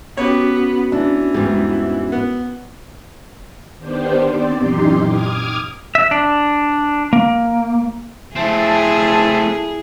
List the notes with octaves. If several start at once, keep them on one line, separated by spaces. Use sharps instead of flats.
B3 C#4 F#4 G4 C#5
E3 D4
E2 G#2 G3
B3
D#3 B3 D4 G4 C5
C4 D5
F#2 A#2 E3 D#4 G4 C6
D6 D#6 F6 G#6
E5
D4
A#3
A3 C4 E4 G#4 E5 A5